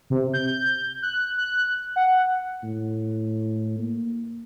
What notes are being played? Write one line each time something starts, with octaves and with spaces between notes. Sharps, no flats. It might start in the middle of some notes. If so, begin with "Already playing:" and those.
C3
G6
F#6
F#6
F#5
A2
A#3